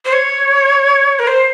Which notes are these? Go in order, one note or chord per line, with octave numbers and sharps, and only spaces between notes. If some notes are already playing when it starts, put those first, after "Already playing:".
C5
C#5
A#4
C5